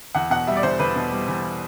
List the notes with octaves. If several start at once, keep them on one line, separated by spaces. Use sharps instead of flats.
E2 F#5
B2 F#5
G3 E5
D5
E2 C5
E2 B4
B2
G3
E2